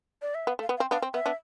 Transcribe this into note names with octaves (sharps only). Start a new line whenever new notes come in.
D5
E5
B3 F5
A3
F5
B3
F5
C4
B3 D4 F5
C4
B3 E5
B3 D4